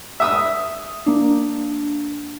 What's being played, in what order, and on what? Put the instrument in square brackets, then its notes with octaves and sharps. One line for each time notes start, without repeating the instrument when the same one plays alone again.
[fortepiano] E5 D#6 E6
[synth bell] A#3 D4